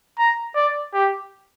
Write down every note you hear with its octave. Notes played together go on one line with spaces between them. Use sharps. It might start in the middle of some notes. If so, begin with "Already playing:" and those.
A#5
D5
G4